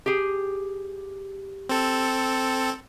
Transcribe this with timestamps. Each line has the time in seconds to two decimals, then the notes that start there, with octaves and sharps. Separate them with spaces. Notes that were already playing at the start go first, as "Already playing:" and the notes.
0.06 G4 G#4
1.69 C4 A4